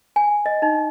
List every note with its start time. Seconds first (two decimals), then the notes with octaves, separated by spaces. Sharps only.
0.16 G#5
0.46 D#5
0.62 D#4